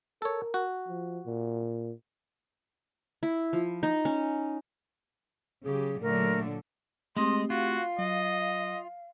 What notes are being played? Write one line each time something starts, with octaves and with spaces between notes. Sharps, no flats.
A4 A#4 C#5
F#4
F3
A#2
E4
F3
D#4
C#4
C#3 F#3 G4 G#4
A#2 D3 F#3 A3 A#4
G#3 A3 C4 G4 D#5 C6
F4 F#4 F5
F#3 D#5